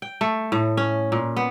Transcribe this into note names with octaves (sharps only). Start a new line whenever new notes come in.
G5
A3
A2
C#4
A#2
B3